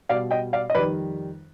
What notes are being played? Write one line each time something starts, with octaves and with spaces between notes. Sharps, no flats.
B2 G3 D5 F5
D#5 G5
D5 F5
D#5
F2 D#3 G3 B4 D5